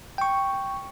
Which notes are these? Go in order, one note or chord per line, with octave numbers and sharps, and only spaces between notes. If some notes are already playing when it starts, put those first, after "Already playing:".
G5 C#6